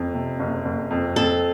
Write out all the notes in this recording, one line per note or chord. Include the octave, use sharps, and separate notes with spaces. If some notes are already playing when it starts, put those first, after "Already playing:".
Already playing: F#1 F2
C3
F#1
F#1
F2
F2 A4